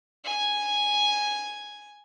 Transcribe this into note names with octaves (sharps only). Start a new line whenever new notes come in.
G#5 G#6